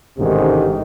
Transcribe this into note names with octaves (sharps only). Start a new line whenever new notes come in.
A1 D2 G#2 C3 D#3